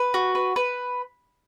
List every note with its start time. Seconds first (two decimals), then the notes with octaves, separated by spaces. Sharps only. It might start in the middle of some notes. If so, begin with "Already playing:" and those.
Already playing: B4
0.14 F#4
0.35 B4
0.56 B4